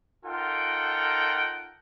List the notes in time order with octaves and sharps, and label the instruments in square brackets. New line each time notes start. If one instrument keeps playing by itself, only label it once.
[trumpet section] D#4 F4 A4 A#4 F#5 G5